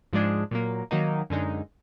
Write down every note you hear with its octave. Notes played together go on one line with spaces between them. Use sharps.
G#2 F3 G#3 D4 G#4
A#2 F#3 A#3
D#3 F#3 A#3 D#4
F#2 D3 G#3 D#4